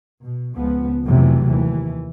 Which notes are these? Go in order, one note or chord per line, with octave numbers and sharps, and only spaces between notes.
B2
C#2 F3 B3
F1 F2 C3 E3 F#3 A3
D#2 E3